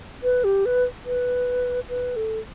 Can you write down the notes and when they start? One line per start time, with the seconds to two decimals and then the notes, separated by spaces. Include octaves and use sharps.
0.23 B4
0.44 G4
0.65 B4
1.06 B4
1.89 B4
2.16 A4